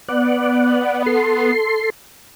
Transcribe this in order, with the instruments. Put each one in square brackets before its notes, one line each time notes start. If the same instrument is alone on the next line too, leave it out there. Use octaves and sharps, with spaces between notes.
[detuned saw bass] B3 [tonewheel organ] D5 F#5
[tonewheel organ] A4 C6